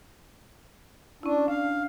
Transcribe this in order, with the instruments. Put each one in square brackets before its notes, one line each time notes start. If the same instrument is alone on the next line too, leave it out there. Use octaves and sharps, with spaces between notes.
[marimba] C#4 E4 [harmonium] D4
[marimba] D4 [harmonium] F5